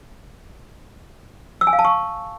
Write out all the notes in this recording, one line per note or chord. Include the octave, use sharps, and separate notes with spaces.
E6
G#5
F5
A5
C#6